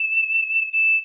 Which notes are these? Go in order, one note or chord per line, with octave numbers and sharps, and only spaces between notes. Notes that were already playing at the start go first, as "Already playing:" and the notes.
Already playing: E7
E7